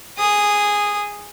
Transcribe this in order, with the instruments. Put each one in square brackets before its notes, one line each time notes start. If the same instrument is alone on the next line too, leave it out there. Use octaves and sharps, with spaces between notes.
[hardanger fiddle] G#4 D#6